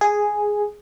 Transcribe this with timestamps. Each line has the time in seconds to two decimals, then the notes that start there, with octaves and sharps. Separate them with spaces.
0.01 G#4